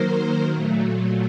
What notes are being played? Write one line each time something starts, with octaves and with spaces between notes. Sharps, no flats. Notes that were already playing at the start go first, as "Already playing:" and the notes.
Already playing: D#3 F#3 A#3 A#4 C5
A#2 F#3 A3